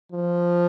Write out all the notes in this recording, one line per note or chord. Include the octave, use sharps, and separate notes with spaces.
F3